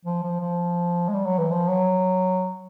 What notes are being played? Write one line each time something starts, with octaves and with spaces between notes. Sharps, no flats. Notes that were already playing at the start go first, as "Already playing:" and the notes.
F3
F3
F3
G#3
G3
F#3
E3
F3
F#3